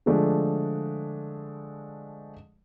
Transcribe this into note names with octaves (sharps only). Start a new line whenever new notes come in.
D3 F3 G#3 A3 D4